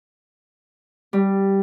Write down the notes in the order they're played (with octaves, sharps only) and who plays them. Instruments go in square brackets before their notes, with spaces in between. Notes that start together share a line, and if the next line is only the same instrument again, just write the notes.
[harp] G3